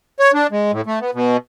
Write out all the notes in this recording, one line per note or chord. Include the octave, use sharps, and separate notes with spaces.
C#5
D4
G#3
A2
A3
B3
B2